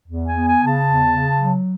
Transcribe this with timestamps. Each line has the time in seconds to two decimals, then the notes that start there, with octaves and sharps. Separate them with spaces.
0.07 E2
0.27 G#5
0.33 B3
0.47 G#5
0.59 C#3
0.66 A5
0.85 E2
1.12 C#3
1.37 F#3